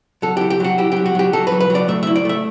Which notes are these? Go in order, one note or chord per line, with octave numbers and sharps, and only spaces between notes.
F#3 A4
E4 G4
G4
F#3 F#4
E4 G4
F#3 G4
F#4
F#3 G4
F#3 A4
B4
F#3
B4
F#3 D5
A3 E5
E4 E5
D5
A3 E5